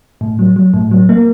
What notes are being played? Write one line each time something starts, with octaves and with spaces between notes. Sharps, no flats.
A2
F#3
F#3
A2
F#3
A#3